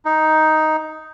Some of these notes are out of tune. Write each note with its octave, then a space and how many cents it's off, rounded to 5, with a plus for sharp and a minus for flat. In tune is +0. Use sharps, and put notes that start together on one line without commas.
D#4 +5